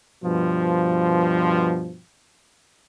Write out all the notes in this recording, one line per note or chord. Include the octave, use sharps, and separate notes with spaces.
G2 B2 F3